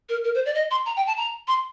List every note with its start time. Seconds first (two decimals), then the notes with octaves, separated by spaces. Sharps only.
0.09 A#4
0.24 A#4
0.34 C5
0.46 D5
0.55 D#5
0.71 C6
0.86 A#5
0.97 G5
1.07 A5
1.17 A#5
1.48 C6